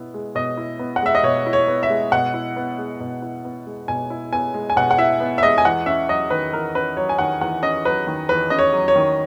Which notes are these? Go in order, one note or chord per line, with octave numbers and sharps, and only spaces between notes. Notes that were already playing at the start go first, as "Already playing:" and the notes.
Already playing: B2 B3 E4
G#3
B2 D#5
E4
B3
F#5
G#3 E5
D#5
B2 C#5
E4
C#5
B3
E5
G#3
B2 F#5
E4
B3
G#3
B2
E4
B3
G#3
B2 G#5
E4
B3 G#5
G#3
G#5
B2 F#5
F#5
E4 E5
B3
E5
G#3 D#5
G#5
E2 F#5
C#4 E5
F#3 D#5
D#3 B4
E2 A#4
C#4 B4
F#3 C#5
G#5
D#3 F#5
E2 F#5
C#4 D#5
F#3 B4
D#3
E2 B4
C#4 D#5
C#5
F#3
C#5
D#3